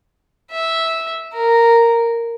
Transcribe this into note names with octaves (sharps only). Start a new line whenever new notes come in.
E5
A#4